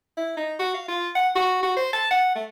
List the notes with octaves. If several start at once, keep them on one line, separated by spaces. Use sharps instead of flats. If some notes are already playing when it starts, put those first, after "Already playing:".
E4
D#4
F#4
F5
F4
F#5
F#4
F#4
C5
A5
F#5
A3